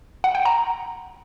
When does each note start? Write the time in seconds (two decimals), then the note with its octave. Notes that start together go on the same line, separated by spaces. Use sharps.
0.24 F#5
0.35 G5
0.45 A#5